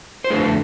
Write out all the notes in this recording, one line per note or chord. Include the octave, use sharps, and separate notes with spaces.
C5
F2 D3 A3 G#4 B4
A4